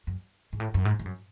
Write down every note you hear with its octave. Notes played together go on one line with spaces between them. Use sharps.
F#2
G#2
A2
F#2
G#2
G#2
F#2